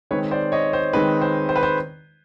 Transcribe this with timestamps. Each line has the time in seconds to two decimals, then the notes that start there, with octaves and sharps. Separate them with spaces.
0.11 D#3 G#3 C4 D#4 B4 C#5
0.31 C5 D5
0.52 C#5 D#5
0.73 C5
0.93 D#3 G#3 C4 D#4 B4
1.22 C5
1.49 C5
1.56 B4
1.63 C5